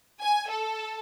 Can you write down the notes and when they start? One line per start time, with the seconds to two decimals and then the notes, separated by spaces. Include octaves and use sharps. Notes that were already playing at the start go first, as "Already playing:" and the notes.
0.21 G#5
0.50 A4